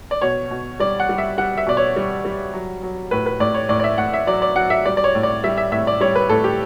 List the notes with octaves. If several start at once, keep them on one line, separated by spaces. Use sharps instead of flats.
D5
B2 C#5
B2
G3 D5
F#5
G3
E5
G3 F#5
E5
B2 D5
C#5
G3
G3
F#3
F#3
A2 B4
B4
A2 D5
C#5
A2 D5
D5
E5
A2 F#5
E5
F#3 D5
D5
F#3 F#5
E5
G3 D5
D5
C#5
A2
D5
G3 E5
E5
A2 E5
D5
G3 C#5
B4
A2 A4
G4